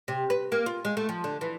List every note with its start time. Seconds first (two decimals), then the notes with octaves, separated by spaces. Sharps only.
0.08 C3
0.30 B4
0.52 A#3
0.66 F4
0.85 G#3
0.97 A3
1.09 F3
1.24 D3
1.41 E3